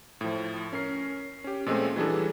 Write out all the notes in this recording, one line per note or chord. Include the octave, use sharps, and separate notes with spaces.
A2 F3
C#4 A#4 C7
C#4 G4
A#2 F3 G#3 A3 C4 C#4
E3 F#3 G3 D4 G#4 A4